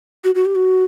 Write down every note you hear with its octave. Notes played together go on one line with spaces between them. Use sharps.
F#4
F#4
G4
F#4